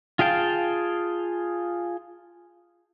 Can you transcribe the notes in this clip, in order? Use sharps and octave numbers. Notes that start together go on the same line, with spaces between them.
F4 G#4 F5 G5 A5